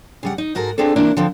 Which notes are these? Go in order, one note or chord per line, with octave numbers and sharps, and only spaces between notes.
C#3 G3 F#5
D#4
G#2 F#4 A4 A#4
B3 C4 D4 F4 G#4 A4
C3 E3 A#3 D4 E4
D3 F3 C4